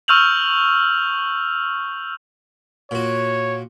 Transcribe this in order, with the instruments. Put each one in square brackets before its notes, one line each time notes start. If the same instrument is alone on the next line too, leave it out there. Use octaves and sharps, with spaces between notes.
[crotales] C#6 E6 F6 G6 F7 F#7
[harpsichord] A#2 F#4 [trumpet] C#5